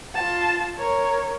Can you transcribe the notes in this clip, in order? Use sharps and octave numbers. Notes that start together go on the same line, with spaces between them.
F4 A5
A#4 C#5